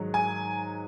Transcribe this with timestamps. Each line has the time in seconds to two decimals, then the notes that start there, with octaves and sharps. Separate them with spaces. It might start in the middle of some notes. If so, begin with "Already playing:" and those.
Already playing: G#2 D#3 F#3
0.14 G#5